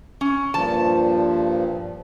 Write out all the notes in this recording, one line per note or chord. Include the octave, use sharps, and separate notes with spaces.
C#4
G2 A#2 F3 A5